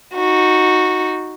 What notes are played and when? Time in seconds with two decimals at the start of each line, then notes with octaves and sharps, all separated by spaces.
0.15 D#4 F#4